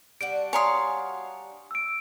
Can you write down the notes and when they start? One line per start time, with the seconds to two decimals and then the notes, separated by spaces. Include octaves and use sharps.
0.21 G3 D4 F#4 D7
0.53 C#5 F5 G#5 A#5 C6 D#6
1.71 E6 D7